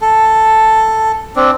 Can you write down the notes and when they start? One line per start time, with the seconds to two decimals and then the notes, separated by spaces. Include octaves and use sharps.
0.01 A4
1.36 C4 D4